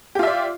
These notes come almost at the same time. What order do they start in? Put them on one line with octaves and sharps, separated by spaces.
G4 F4 E5 D5